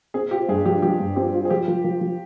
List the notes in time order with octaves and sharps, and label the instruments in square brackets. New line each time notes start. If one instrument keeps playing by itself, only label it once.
[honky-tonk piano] C4 [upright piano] G#4
[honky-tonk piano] F4 [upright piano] G4
[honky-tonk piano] G2 [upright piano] G#4
[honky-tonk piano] F3 [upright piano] G4
[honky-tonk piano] F3 [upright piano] G4
[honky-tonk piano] G2
[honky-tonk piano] C4 [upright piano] G4
[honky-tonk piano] F4
[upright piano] G#4
[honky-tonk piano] F3 [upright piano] G4
[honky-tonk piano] F3
F3
F3